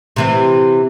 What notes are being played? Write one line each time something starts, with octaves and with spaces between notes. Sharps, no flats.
C3 E3 C4